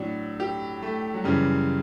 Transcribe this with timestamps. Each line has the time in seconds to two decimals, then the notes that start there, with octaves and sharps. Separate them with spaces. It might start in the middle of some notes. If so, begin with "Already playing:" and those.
Already playing: A2 F#3 D4
0.40 G4
0.82 A3
1.14 F#3
1.24 F#2 C#3 E3 G3